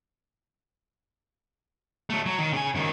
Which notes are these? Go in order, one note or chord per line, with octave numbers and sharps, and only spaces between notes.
F#3 A3
F#3
D#3
C#3 G#5
F#2 D#3